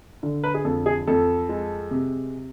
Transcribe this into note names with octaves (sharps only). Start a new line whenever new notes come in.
D3
B4
G#4
F2 A4
G#4
F2 A4
G#3
C3